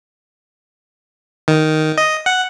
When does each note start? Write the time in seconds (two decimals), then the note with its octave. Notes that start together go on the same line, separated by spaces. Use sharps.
1.48 D#3
1.98 D#5
2.26 F#5